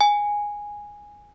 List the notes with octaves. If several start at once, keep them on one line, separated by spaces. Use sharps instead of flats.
G#5